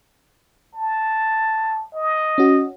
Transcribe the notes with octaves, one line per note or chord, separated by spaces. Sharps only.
A5
D#5
C#4 F#4